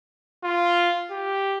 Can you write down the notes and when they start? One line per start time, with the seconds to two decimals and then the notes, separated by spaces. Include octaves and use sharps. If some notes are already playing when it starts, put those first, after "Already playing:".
0.44 F4
1.11 G4